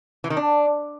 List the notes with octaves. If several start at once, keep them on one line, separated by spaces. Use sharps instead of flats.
E3
D#3
D4